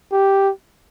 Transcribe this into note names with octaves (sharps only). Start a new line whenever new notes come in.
G4